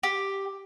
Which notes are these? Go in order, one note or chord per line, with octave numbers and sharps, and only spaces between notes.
G4